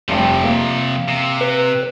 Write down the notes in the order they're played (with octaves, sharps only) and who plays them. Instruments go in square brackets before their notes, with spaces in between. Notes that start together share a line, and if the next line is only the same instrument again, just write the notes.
[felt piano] F1 G2 G4 [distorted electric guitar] C3 F3
[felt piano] A#3
[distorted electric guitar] C3
[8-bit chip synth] B4